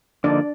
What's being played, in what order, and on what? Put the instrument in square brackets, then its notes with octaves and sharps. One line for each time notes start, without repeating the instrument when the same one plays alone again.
[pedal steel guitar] D3 F3 A#3 D#4 [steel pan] D4 D5